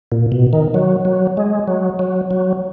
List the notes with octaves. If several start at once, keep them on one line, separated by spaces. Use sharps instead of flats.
A#2
B2
D#3
F#3
F#3
G#3
F#3
F#3
F#3